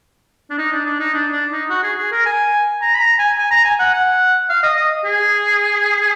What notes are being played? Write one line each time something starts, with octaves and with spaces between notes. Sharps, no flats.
D4
D#4
D4
D4
D#4
D4
D4
D#4
F#4
G#4
G#4
A#4
G#5
A#5
B5
A#5
G#5
G#5
A#5
G#5
F#5
F#5
F5
D#5
D#5
G#4